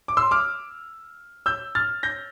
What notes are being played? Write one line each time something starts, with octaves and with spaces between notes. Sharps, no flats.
D6
C6 E6
D6 F6
E6 G6
F6 A6
G6 A#6